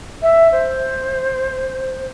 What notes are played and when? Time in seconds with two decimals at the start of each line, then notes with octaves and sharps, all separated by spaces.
0.22 E5
0.52 C5